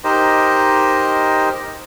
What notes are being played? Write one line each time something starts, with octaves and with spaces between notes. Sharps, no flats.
D#4 G4 A#4 C5 D#5